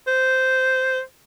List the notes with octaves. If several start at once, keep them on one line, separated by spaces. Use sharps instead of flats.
C5